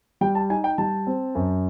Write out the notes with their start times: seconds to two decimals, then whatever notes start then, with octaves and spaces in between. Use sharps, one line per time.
0.21 G3 G5
0.35 A5
0.50 D#4 G#5
0.64 G5
0.78 G3 A5
1.07 C4
1.35 F#2